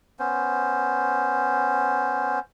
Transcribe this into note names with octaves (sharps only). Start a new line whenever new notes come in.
B3 C#4 C5